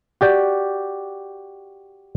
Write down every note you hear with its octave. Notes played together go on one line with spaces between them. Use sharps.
F#4 G4 D5 G5